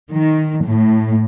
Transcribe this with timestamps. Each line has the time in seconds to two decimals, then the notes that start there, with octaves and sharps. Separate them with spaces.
0.10 D#3
0.64 A2